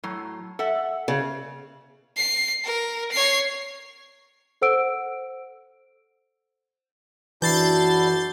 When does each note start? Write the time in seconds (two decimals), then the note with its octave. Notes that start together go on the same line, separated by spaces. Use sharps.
0.04 A2 F#3
0.59 A4 E5 F#5
1.08 C#3
2.17 C7
2.64 A#4
3.11 C#5 C7
4.62 A4 C5 F#5 E6 D7
7.42 F#1 E3 D4 E4 F#4 G6 A6 C7